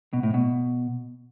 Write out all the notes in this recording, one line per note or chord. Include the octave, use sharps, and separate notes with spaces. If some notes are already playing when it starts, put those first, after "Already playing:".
B2
A2
B2